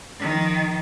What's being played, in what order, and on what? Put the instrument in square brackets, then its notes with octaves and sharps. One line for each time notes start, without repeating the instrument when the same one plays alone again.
[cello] D#3 F3